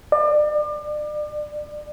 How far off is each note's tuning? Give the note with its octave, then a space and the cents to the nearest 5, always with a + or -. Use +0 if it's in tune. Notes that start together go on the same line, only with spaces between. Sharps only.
D5 +35